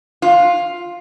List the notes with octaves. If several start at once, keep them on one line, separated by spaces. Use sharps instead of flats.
F4